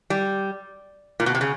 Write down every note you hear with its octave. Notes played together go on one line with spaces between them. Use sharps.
G3
A#2
B2
C3
C#3